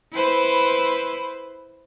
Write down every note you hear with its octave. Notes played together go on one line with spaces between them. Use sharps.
E4 B4 C5